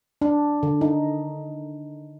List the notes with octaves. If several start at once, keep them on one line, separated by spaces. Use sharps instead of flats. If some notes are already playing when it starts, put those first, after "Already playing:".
D4
D3
D#4